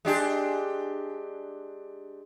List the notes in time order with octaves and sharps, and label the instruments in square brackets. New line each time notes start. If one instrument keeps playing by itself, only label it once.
[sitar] G#3 D4 G4